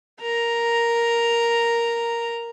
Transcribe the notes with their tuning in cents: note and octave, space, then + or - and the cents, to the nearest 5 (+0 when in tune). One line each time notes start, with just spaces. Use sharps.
A#4 +0 A#5 +0